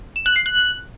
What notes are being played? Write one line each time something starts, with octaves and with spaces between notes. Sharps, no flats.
E7
F#6
C7
F#6